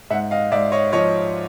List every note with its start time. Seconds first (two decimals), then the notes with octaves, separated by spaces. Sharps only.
0.10 G#2 E5 F#5
0.31 D#5 F5
0.51 G#2 D5 E5
0.72 C#5 D#5
0.92 F3 C#5 D#5